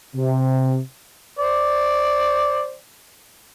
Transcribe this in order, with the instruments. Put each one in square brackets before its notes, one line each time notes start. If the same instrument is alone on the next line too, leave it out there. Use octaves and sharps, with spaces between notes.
[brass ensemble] C3
[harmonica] C5 D5